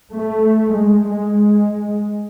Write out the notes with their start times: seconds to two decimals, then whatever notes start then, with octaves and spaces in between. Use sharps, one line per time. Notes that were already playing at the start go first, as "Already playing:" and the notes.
0.13 A3
0.76 G#3
1.09 G#3